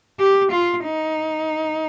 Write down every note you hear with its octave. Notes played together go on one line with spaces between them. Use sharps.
G4
F4
D#4